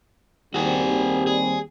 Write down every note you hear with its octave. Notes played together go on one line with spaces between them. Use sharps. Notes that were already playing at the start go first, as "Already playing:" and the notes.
D#2 G3 C4 F#4 G#4
G#4